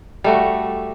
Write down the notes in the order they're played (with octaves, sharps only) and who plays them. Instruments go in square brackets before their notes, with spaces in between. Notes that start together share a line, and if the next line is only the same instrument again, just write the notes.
[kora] G3 A3 F#4